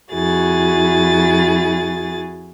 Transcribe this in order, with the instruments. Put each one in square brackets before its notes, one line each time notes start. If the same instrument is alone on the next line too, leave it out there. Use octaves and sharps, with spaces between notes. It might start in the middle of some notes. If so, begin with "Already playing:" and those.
[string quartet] F2 E4 F#4 G#4 A6